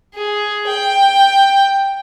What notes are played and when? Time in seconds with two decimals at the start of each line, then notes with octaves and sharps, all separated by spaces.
0.14 G#4
0.68 G5